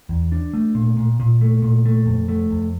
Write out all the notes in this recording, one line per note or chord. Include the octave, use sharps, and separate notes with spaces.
E2
D4
A3
A#2
A#2
A#2
A3
A#2
A3
F2
A3
F2